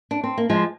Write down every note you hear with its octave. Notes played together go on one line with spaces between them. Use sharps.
D4
C4
A#3
F3 G#3